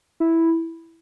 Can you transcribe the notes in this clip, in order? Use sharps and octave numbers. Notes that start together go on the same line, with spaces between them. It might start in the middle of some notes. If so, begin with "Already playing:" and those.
E4